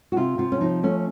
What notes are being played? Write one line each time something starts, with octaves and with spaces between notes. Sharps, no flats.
F#4
C3 F4
C3 F4
C#4
F3 D#4
A3 C#4